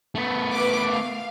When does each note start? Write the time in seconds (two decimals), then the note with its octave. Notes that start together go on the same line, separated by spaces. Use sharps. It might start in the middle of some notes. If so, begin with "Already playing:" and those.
0.15 A3 B3
0.52 B4 D6
0.90 F5